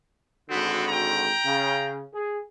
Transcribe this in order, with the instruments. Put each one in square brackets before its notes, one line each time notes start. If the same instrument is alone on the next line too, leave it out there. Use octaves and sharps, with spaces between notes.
[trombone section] G#1 D3 F#4 [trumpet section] B3 C4
[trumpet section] G5 A#5
[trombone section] C#3
G#4